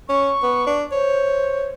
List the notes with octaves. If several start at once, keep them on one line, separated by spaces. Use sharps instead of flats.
C#4 C#6
B3
D4
C5 C#5